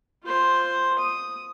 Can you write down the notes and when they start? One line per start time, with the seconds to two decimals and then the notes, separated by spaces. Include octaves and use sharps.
0.24 F4 C5
0.99 D#6